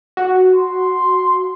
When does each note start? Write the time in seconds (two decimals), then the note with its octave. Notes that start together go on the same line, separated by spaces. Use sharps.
0.17 F#4
0.55 C6